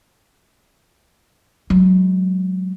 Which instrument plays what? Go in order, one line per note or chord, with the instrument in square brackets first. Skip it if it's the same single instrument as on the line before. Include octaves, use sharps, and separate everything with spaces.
[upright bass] F#3 G#3